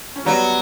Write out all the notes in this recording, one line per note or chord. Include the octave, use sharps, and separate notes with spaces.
C#4
F#3 G3 B3